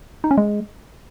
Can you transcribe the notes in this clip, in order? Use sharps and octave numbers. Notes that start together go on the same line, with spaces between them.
D#4
C#4
G#3